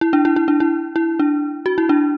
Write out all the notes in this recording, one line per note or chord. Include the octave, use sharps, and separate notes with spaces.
E4
D4
E4
E4
D4
E4
E4
D4
F#4
E4
D4